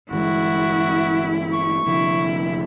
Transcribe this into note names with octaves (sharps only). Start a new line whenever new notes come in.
G1 E3 G#3 E4 F#4
C#6
F1 F2 D3 E4